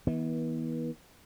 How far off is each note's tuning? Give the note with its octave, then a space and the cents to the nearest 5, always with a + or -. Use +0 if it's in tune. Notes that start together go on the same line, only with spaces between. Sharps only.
E3 -45 B3 -35